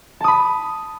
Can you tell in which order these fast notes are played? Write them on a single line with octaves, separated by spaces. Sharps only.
A5 D#6 B5